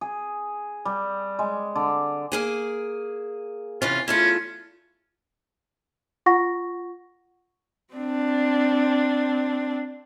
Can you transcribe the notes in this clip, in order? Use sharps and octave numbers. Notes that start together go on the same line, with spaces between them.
G#4
G3
G#3
D3
A#3 G#4 G#5
C3 E3 C#4 F4
E2 A3 C#4 F4
F4 F#5 C#6 A#6
C4 D4